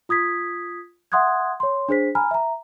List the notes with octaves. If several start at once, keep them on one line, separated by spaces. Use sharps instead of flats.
F4 D#6 G#6 B6
E5 F#5 C6 D#6 F#6 G#6
C#5 C6
D4 G#4 C5 B6
G#5 A#5 B5 F6
E5 A#5